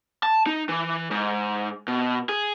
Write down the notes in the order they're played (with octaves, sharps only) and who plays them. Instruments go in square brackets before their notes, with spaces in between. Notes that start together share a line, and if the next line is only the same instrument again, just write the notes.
[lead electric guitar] A5
D#4
E3
G#2
B2
G#4